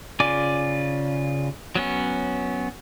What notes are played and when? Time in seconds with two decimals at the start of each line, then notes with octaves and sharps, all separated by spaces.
0.20 C#3 F4 D5 G#5 D6
1.75 F#3 B3 C#4